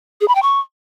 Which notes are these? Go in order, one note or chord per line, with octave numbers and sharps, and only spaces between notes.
G#4
B5
G5
C#6